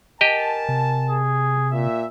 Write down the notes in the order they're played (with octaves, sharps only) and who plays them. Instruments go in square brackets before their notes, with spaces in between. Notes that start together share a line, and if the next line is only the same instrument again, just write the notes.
[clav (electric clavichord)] G4 D#5 [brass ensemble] A#4 G#5 A5
[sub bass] C3
[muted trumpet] G#4
[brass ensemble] A#2 E5